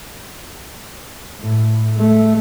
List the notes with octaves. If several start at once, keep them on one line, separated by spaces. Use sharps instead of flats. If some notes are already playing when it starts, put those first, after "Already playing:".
A2
A3